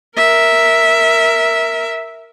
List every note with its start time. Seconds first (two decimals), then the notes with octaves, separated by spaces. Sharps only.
0.17 A#4 E5